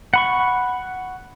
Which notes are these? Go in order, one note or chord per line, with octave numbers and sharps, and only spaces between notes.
F#5 B5 C#6